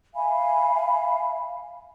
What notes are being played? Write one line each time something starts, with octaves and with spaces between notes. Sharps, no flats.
E5 F5 G#5 B5